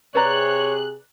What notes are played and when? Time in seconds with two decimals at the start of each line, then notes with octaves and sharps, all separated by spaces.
0.15 C3 G#4 B4 C#5 D5 A#5 F#6